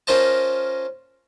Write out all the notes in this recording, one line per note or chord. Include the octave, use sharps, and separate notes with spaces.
C#4 F4 A#4 C5 D#5 A5